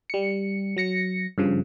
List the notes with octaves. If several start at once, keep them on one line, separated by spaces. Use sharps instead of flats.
G3 C#7
F#3 A#6 C#7
G2 C#3 F3